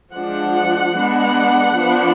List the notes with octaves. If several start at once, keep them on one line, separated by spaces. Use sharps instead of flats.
F3 G#3 D4 F#5
G#3 B3 D4
F3 B3 D4